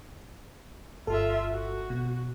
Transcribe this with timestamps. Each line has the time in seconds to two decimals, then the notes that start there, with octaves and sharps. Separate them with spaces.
1.07 G1 F4 A4 E5
1.51 F#4
1.90 B2